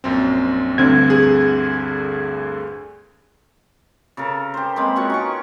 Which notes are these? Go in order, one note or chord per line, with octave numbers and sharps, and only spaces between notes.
A#1 F#2 C4
D2 G2 D3 C4 G#6
G#4
C#3 A4 A#4
G4 C5
G#3 A#3 C4 B5
C#4 F4 F#4 C#6
D#4 G5 C#6